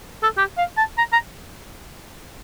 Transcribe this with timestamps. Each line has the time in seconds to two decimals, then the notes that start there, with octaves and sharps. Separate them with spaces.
0.23 A4
0.37 G4
0.58 F5
0.77 A5
0.98 A#5
1.13 A#5